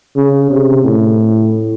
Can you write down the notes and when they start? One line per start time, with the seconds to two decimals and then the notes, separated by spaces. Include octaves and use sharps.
0.16 C#3
0.50 C3
0.85 A2